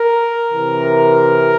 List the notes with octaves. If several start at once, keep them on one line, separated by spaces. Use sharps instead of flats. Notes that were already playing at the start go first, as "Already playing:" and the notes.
Already playing: A#4
C3 E3